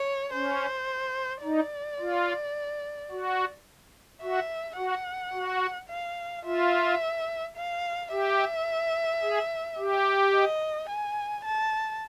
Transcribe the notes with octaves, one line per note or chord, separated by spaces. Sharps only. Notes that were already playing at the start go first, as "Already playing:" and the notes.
Already playing: C#5
C#4 C5
D#4 D5
F4
F#4
F#4 E5
F#4 F#5
F#4
F5
F4 E5
F5
G4 E5
G#4
G4
D#5
G#5
A5